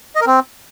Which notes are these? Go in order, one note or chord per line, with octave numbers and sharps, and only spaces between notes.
D#5
A#4
C4